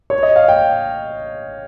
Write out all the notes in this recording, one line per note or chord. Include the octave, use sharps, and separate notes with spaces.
C#5
D#5
F5
G5